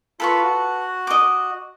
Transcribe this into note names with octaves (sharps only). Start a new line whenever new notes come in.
F4 A4 B4 B5 C#6
F#4
D#5 D6